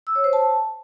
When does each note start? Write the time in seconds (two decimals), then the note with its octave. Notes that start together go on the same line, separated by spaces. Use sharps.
0.07 E6
0.15 C#5
0.24 C5
0.33 A5